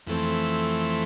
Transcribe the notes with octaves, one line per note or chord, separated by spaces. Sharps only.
F2 E3 A3 C4